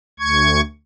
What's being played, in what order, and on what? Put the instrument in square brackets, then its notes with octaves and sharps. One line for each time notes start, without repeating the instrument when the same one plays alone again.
[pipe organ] D2 C#6 G#6